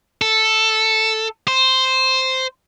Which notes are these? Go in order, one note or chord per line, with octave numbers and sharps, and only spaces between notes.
A4
C5